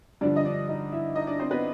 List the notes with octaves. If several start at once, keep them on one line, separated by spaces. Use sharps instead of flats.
G2 D3 F3 D4 D5
D#5
D4 D5
D#4 D#5
E4 E5
D#4 D#5
D4 D5
C4 C5
B3 B4